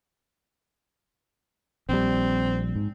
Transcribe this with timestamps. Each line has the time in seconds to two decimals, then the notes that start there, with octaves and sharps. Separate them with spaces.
1.89 A#1 G3 C4
2.75 G#2